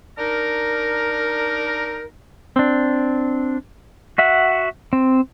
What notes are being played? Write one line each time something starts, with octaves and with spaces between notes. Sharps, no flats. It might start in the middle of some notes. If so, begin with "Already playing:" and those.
D4 D#4 A#4
C4 D4
F#4 E5 F#5
C4